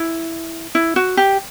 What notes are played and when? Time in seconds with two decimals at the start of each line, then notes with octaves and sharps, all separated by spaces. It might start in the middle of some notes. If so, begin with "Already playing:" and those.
Already playing: E4
0.75 E4
0.96 F#4
1.17 G4